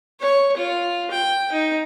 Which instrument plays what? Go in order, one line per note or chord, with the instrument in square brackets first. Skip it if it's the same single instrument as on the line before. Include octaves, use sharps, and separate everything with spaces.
[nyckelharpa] C#5
F4
G5
D#4